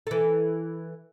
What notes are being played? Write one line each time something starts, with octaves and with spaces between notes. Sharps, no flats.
E3 A4